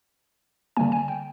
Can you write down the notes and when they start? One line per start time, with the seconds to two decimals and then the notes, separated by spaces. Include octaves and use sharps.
0.77 D3 G3 A#3 G#5
0.92 G#5
1.08 G5